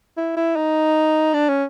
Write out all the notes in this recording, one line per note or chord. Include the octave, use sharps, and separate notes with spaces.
E4
E4
D#4
D4
C#4